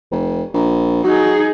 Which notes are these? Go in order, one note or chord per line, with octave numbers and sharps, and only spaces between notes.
F1
A#1
F#3 D#4 G#4